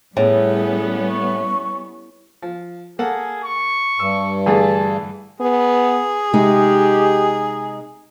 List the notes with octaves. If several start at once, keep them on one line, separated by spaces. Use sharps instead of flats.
A2 G3 B3 C#4 G#4
C#6
F3
A#3 G#4 A4 F#5
C#6
G2 E6
D3 E3 A3 G#4 A5
B3 G#4
C3 G#3 D#4 G4